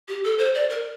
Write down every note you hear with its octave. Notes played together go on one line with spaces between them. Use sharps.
G4
A4
C5
D5
A#4